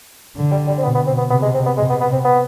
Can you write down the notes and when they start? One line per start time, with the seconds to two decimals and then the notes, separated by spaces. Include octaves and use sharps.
0.36 D3
0.51 G3
0.67 G3
0.78 C4
0.82 B2 B3
0.95 B3
1.07 C4
1.18 B3
1.30 C3 B3
1.42 G#3
1.54 C4
1.66 B3
1.77 C3 G#3
1.89 B3
2.01 B3
2.12 C4
2.25 B3